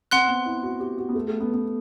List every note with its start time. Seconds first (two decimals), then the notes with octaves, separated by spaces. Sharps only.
0.11 C4 F#5 C6 F#6
0.28 B3
0.46 E4
0.63 F#4
0.80 G4
0.98 F#4
1.09 B3
1.15 A3
1.28 A3
1.40 B3
1.54 B3